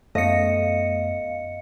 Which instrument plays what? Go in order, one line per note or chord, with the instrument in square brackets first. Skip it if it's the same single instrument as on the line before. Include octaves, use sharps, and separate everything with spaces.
[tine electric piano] F#2 B3 [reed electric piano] A3 [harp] D#5 [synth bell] F5 C#7